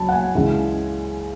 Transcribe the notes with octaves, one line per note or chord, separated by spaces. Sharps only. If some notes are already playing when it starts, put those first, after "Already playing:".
Already playing: C#2 F#3 A5 B5
F#5
G#5
C#2 C#3 E3 G#3